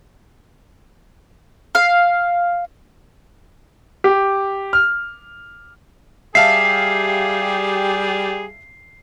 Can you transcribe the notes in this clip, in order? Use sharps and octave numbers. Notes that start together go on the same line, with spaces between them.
F5
G4
F6
G3 G4 G#4 E5 F5 A5 C7